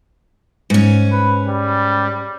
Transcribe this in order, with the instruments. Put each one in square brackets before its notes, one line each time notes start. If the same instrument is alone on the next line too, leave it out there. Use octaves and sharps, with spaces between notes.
[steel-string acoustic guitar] G#2 C#4
[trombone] B4
G3